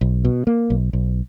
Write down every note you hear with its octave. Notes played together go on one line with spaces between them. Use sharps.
B1
B2
A#3
B1
B1